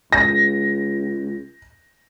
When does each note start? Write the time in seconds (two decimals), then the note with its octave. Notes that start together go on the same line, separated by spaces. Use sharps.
0.12 C#2 A#6